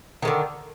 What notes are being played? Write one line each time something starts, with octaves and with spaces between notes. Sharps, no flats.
D3 D#3 G#3